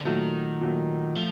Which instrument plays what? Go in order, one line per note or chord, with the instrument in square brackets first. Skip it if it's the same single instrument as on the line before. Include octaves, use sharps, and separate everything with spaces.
[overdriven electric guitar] D3
[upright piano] A#2 F#3 A3 [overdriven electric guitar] D#3
[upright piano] A#2 F#3 A3
[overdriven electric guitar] F3 [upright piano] A3